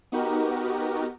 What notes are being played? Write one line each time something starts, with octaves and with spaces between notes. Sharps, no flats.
B3 D#4 F#4 G4 A#4